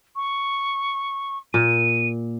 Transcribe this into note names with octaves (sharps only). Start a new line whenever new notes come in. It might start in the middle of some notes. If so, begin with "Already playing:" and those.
C#6
A#2 D#7